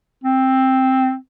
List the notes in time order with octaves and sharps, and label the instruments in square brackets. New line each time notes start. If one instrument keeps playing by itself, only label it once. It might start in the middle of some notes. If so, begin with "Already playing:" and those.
[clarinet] C4